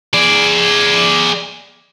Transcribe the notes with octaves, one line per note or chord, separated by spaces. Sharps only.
G#4 D5